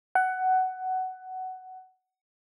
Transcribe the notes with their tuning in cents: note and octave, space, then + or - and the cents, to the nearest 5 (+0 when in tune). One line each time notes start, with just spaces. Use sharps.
F#5 +15